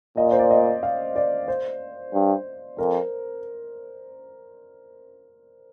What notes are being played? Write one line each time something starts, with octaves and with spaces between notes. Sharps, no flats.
A#2 D#5
D5
C5
D5
D#5
F5
D5
C5
G2
F2 A#4